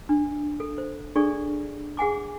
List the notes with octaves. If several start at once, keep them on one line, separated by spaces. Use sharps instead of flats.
D4
A4
C5
D4 G#4 A4 D5 C#6
G#4 F#5 G#5 D6